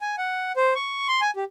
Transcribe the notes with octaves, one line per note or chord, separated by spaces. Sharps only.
G#5
F#5
C5
C#6
C6
G#5
G4